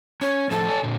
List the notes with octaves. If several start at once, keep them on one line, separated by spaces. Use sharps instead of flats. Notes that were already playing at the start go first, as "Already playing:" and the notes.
C#4 C#5
A2 F3 F4 A4
C#5 G#5 A5
A#2 D3